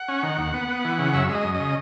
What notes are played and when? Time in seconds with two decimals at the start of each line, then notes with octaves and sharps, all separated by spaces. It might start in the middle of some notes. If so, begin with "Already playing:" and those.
Already playing: F#5
0.09 C#4
0.23 D#3
0.38 D#2
0.54 B3
0.68 B3
0.85 E3
0.99 C#3
1.14 F#2 E5
1.29 G#3 E5
1.35 D#5
1.44 F#2
1.55 D#5
1.60 C#3